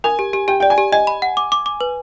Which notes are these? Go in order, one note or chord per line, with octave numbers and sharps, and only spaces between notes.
A#4 G#5
G4
G4
G4 G5
D5 G5
G#5
G4
D#5 G#5
B5
F#5
D6
D6
D6
B4